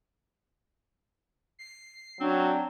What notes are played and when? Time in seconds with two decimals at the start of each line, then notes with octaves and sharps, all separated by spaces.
1.59 C7
2.20 F#3 C4 D4